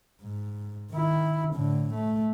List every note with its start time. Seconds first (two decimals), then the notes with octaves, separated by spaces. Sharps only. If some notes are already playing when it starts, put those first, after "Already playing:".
0.22 G#2
0.91 D#3 E4
1.55 A2 D3
1.94 A3